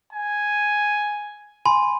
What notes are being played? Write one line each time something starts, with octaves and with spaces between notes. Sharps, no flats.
G#5
G#5 B5 C6